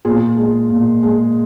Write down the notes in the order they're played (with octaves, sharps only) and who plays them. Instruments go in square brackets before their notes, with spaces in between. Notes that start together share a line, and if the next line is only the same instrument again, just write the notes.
[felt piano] A#2 F4 G#4
G#3
A#2
G#3